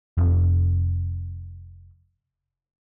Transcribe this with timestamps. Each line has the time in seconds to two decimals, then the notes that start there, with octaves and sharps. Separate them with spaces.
0.17 F1 F2